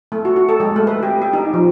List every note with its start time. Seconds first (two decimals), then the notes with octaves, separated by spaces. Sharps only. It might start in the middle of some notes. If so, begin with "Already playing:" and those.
0.12 A3
0.25 F#4
0.36 F#4
0.49 A4
0.60 G#3
0.76 A3
0.87 B4
1.03 G4
1.22 G4
1.33 D#4
1.54 F3